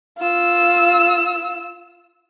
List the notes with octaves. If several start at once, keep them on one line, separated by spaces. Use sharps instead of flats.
F4 E6